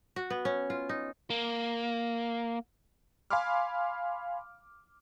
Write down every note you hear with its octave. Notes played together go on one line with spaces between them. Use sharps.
F#4
B3
C#4
F4
D#4
A#3
F5 G#5 B5 C6 D6 F6